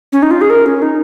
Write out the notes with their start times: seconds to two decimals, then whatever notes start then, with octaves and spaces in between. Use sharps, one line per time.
0.12 C#4
0.22 D#4
0.31 F4
0.41 G#4
0.50 A#4
0.66 C#4
0.82 D#4